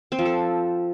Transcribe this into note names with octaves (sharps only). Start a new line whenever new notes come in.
C4
F3
A4